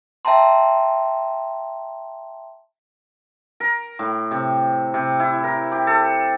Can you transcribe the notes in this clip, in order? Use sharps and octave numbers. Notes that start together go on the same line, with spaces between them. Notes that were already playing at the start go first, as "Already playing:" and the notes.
E5 G5 A5 A#5 C6
A#4
A2
C3
C3
E4
A#4
G4
A4